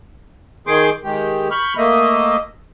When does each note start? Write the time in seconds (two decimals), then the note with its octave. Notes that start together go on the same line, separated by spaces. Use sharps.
0.67 D#3 G#4 C6 D6 G6
1.04 D#3 G#3 G4
1.51 B5 C#6 F6 G6
1.77 A3 A#3 D#5 E5